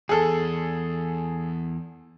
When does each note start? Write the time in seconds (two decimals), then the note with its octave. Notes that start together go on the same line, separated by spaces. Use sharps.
0.09 E2 G#4 A4